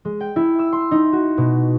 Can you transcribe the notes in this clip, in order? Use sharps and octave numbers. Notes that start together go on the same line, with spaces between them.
G#3
G5
E4
E6
C6
D#4
F#4
B2